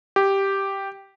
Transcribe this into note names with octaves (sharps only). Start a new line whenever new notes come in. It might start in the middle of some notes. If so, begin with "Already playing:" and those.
G4